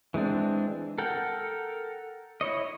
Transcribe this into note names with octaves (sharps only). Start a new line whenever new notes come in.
E3 G#3 C4 D4
A4 A#4 F#5 G5
E4 C#5 D#5